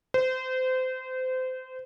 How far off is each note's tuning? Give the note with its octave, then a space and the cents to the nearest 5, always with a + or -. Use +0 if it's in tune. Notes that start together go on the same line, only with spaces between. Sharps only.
C5 -25